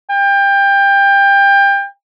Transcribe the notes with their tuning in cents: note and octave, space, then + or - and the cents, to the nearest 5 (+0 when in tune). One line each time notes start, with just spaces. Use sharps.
G5 +25